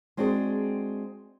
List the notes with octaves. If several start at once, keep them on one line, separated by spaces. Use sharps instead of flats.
G#3 C4 D4 F#4 G#4 C5